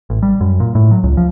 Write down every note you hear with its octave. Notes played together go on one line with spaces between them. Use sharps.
A1
G3
F#2
A#2
A2
F#3
C#2
F3